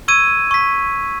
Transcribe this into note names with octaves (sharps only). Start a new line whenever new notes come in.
C#6 E6 G#6 D#7
C#6 B6